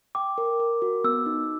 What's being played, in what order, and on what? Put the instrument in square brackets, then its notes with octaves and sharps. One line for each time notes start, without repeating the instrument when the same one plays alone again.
[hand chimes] G5 [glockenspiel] D6
[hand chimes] A#4
A#4
F#4
[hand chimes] B3 [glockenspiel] E6
[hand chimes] D#4